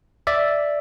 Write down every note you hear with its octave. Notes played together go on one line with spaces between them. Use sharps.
D5 E5